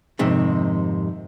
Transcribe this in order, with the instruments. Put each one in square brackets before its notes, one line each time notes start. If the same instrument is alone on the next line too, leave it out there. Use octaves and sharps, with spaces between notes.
[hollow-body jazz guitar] F2 G#2 C3 D#3